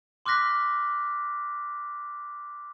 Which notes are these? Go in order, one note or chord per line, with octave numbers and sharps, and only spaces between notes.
C6 D6 F6 F#6 A#6 B6